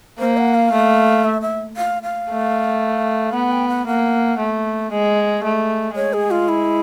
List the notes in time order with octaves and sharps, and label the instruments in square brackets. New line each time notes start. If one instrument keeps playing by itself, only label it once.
[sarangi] A#3 [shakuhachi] C5
[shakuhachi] F#5
F5
[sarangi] A3
[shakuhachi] E5
E5
F5
F5
[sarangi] A3
[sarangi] B3 [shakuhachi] F#5
[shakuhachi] G5
F#5
[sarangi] A#3 [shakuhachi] F#5
[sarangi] A3
G#3
A3
[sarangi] G#3 [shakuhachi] C#5
[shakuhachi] G#4
F4
E4